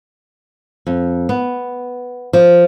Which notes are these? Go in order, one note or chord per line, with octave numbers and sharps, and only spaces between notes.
F2
B3
F3